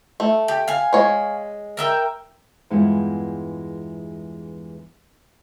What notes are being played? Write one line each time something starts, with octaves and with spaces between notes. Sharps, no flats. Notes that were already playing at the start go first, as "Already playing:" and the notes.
A3
G4
F5 G#5
G#3 C#5
A#4 E5 G5
E2 G2 G#3 E4 F4 F#5